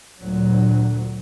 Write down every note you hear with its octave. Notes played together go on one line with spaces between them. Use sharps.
D2 A#2 F#3